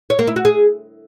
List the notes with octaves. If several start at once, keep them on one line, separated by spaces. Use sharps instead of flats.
C#5
A#3
E4
F#4
G#4